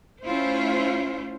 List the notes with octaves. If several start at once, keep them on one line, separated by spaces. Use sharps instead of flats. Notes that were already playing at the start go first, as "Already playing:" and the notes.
A3 C#4 E4 F4 C5